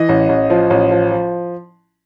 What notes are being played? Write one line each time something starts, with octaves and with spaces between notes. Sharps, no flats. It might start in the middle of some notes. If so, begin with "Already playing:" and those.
Already playing: E3 D#5
A1
A1
F3
A1
F3
F3